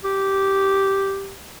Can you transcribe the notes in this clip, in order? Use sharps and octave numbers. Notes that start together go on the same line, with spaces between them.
G4